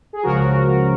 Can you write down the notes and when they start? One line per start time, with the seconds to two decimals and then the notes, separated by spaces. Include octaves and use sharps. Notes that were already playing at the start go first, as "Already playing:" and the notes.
0.13 G#4
0.23 C#2 C#3 F3 F#4 A#4